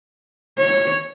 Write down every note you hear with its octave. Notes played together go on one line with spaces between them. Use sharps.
C#5